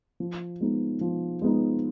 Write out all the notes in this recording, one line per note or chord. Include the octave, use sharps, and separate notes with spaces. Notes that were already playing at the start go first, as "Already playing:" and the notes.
F3
G#3 B3 D#4
F3
G#3 B3 D#4